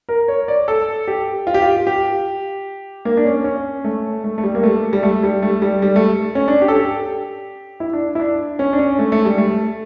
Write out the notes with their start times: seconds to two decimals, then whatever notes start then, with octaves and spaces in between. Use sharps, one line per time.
0.09 A#4
0.28 C#5
0.48 D5
0.68 A4
1.08 G4
1.47 F4
1.54 G4
1.62 F4
1.87 G4
3.05 A#3
3.17 D4
3.25 C#4
3.44 C#4
3.84 A3
4.24 A3
4.38 A3
4.44 G3
4.55 A#3
4.63 A3
4.93 G3
5.03 A3
5.23 G3
5.42 A3
5.62 G3
5.82 G3
5.96 A3
6.35 C#4
6.48 D4
6.62 G4
6.68 A4
6.76 G4
7.80 E4
7.93 D4
8.15 E4
8.20 D4
8.59 C#4
8.73 D4
8.79 C#4
8.99 A3
9.12 A3
9.25 G3
9.38 A3